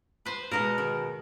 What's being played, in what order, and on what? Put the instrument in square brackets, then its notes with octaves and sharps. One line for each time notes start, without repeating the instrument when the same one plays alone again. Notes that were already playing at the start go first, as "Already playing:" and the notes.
[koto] B4 C5
[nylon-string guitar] B2 G#3 [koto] A#4 D#5
[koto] D#3